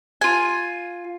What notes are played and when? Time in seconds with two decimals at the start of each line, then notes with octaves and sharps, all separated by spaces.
0.21 F4 G#5